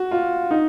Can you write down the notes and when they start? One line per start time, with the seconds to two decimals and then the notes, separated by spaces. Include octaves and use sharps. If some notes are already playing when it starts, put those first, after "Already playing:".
Already playing: F#4
0.11 F4
0.51 D#4